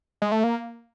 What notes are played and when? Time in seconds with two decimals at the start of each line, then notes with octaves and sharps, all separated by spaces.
0.22 G#3
0.32 A3
0.44 A#3